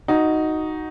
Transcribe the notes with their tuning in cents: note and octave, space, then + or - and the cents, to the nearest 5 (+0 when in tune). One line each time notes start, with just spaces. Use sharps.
D#4 +0 F#4 +0